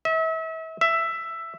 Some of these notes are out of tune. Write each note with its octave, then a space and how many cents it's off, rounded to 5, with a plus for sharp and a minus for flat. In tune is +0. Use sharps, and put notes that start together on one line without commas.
E5 -35
E5 +10